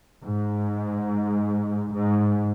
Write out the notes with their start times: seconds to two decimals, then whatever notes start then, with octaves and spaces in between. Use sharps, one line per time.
0.24 G#2
1.95 G#2